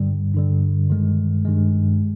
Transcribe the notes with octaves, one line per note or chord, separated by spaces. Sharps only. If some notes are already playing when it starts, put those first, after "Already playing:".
Already playing: G2 D3 G3
G2 D3 G3
G2 D#3 G#3
G2 D#3 G#3